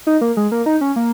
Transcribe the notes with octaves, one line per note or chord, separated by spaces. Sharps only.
D#4
A#3
G#3
A#3
D#4
C#4
A#3